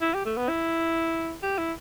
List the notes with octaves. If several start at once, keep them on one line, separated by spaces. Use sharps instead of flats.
E4
G4
A3
B3
E4
G4
E4